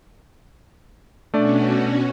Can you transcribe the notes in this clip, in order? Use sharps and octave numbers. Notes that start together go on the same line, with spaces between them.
B2 A3 C#4 D4 F#4 D5